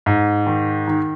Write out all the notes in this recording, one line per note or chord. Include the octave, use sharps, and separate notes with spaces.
G#2
D#3
D#3